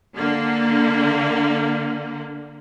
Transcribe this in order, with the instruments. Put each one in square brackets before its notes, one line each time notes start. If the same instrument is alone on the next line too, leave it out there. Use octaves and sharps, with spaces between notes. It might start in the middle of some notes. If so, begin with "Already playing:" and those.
[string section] D3 A#3